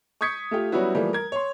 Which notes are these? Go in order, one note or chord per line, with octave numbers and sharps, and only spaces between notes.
C#6 D#6 G6 G#6 B6 C#7
A3 F4 G4
F#3 G3 B3 C#4 E4 F#4
E3 F3 G3 A3 A#3
A#4 G#6
C#5 C6